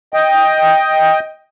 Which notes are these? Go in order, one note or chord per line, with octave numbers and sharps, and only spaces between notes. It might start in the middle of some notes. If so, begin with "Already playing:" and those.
D#5 G5